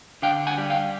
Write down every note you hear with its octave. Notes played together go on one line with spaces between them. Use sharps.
D3 F5 G5
F#5 G#5
G3
F5 G5